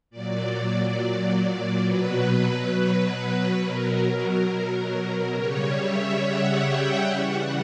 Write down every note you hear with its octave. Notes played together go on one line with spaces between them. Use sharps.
A#2 F#3 D5
B2 F#3 B4
B2 F#3 A#4
C#3 G3 C#5
E5
F#5
G5
C#3 E3 G3 F#5